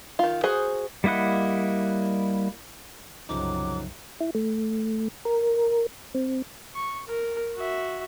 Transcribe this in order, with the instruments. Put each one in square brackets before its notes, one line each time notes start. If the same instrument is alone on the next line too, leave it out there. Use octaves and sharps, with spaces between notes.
[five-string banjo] D#3 F4
F#4 G#4 C5
[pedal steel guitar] G3 A#3 E4 D#5 F#5
[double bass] C2 F#2 [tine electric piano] C#3 F3 D#4 [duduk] F#3 [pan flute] D6
[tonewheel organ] E4
A3
A#4
C4
[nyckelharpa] C#6
A#4
F#4 E5